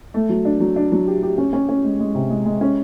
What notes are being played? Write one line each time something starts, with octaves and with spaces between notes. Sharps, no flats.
A3
F#3
D4
F#3
D4
F#3
G4
G4
C#4
C#4
C#4
G#3
G#3
C3
G#3
G#3
C#4